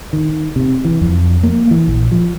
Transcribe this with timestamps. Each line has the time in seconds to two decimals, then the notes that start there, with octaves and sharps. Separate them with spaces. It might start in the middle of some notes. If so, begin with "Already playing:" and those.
0.13 D#3
0.56 C3
0.85 E3
1.01 F2
1.43 A#3
1.71 E3
1.88 A#1
2.12 F3